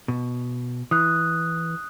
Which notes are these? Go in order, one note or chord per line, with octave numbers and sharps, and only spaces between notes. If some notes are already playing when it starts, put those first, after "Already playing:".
B2
E3 D#6 F#6